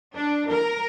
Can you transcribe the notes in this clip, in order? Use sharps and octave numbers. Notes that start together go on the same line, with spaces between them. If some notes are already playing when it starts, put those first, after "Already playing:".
D4
A#4